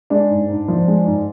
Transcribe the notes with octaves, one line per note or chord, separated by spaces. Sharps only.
G#3 D4
G#2
G#2
F3
G#3
G#2